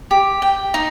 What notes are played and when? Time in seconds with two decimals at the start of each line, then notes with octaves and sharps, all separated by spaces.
0.11 G4
0.42 G5
0.74 D#4